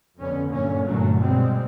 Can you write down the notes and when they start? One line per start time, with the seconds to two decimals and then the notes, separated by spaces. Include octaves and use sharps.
0.19 F2 D3 B3 C#4
0.48 G1 F#2 A#2 D3 A#3 C#4
0.84 G1 G2 A#2 F#3 A3
1.20 B2 G3 G#3 C4